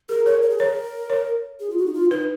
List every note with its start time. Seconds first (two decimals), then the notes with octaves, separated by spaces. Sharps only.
0.09 G#4 A#4
0.26 A#4 C#5
0.42 A#4
0.50 G#4
0.58 A#4 C#5
1.10 C#5
1.60 G#4
1.70 F4
1.78 F#4
1.86 D#4
1.94 F4
2.11 D#4 B4